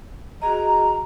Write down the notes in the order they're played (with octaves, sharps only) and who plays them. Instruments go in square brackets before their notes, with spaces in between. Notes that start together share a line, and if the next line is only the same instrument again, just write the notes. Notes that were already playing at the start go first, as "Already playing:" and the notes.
[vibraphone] F#4 G#4 D#5 [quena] A#5